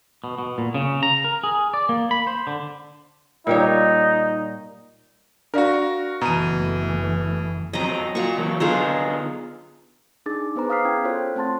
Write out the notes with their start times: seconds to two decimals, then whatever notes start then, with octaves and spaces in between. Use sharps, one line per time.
0.24 B2
0.39 B2
0.58 A#2
0.74 C#3
1.03 A#5
1.24 A#4
1.44 G#4
1.74 D5
1.89 A#3
2.11 B5
2.27 C5
2.47 D3
3.47 A#2 G3 D#4 C#5
5.54 D4 F#4 A#4 D5 F5
6.21 F#1 B2 E3 A3 A#5 D#7
7.73 F2 F#3 C4 D#5 A#5
8.15 A#3 F4 F#4 C#6
8.37 E3 F#3 A#3
8.60 D3 B3 D#4 F4 G#4 A4
10.26 D4 D#4 G#4 D6 A6
10.56 B3 G#4 B4 C5 A#5 D6
10.70 F5 D#6 F6 B6 C7
10.85 C#4 E4 G5 E6 G#6
11.04 F4 A4 C5 C#5
11.35 A3 C4 C5 A5 C6 A6